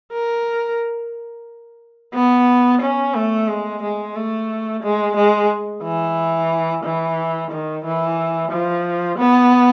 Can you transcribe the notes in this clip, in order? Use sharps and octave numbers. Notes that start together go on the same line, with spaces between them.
A#4
B3
C#4
A3
G#3
G#3
A3
G#3
G#3
E3
E3
D#3
E3
F3
B3